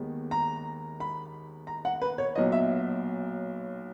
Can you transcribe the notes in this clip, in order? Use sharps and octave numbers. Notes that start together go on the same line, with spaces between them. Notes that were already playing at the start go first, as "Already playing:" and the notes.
Already playing: D#2 D#3 G#3 B3
A#5
B5
A#5
F#5
B4
C#5
B1 A#2 F#3 B3 D#5
E5